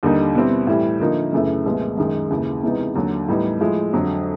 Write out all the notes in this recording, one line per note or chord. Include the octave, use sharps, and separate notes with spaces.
D#2 D3 G3 A#3 D#4
B2 G3 C4 E4
A2 E3 G3
D3 F3 A#3 D#4
F#2 C#3 E3 A3
C2 A#2 F3 G#3 B3
F#2 D#3 G#3
D#2 C#3 E3
C3 E3 G#3 B3 D#4
D#2 D3 F#3
A2 E3 G3 B3 D#4
A2 F3 G#3
F2 D3 F#3